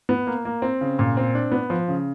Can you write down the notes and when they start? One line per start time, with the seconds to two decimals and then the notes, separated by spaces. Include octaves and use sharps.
0.09 B3
0.27 A#3
0.45 A#3
0.62 C4
0.81 C#3
0.99 A#2
1.17 C4
1.35 D4
1.52 B3
1.70 F3
1.88 C#3